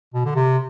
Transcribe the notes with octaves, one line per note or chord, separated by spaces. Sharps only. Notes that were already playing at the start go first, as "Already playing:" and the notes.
B2
D3
C3